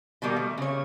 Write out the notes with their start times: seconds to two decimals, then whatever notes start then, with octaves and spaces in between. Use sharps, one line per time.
0.22 B2 D#3 G3 A#3
0.36 A3
0.58 C#3 C#5